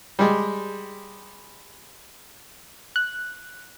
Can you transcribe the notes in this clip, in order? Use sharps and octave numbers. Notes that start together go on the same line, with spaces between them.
G3 G#3
F#6